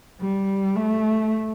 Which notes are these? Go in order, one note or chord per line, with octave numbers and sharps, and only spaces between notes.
G3
A3